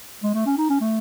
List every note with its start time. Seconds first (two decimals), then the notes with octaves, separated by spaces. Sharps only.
0.23 G#3
0.34 A3
0.46 C#4
0.58 D#4
0.69 C#4
0.81 A3